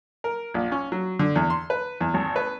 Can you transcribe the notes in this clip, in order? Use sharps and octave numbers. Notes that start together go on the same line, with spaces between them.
A#4
A#1
C#4
F#3
D3
E2
C6
B4
E2
G#1
B4